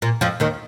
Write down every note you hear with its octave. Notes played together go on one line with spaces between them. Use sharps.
A#2
F2 F3
D#2 D#3